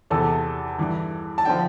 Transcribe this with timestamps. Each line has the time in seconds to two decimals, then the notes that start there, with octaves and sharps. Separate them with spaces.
0.11 E2 C3 E3 A4
0.79 G2 E3
1.38 A5
1.45 D3 F3 G5